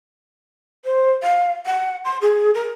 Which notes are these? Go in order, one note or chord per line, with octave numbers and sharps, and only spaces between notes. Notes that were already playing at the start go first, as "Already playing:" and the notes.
C5
F5
F#5
C6
G#4
A#4